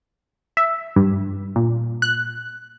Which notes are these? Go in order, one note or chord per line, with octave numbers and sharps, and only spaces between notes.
E5
G2
A#2
F#6